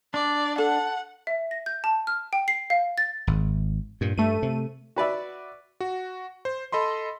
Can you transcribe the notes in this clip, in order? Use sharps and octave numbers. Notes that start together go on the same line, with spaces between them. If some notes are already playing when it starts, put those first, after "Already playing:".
D4 D5
A4 F#5
E5
A#6
G6
A5
F6
G5
C7
F5
A6
G#1
G2 A#2
G2 A3 D#7
C3
F#4 B4 D5 E5
F#4
C5
A4 D#5 B5 C6